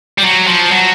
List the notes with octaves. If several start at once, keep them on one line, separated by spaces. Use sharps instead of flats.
G3
F#3
F3
F#3